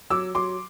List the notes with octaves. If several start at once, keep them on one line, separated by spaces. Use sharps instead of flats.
F#3 D6 E6
F#3 C6 D6